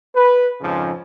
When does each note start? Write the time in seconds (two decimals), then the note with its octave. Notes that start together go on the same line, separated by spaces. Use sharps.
0.15 B4
0.61 F2 G#2 C#3 F3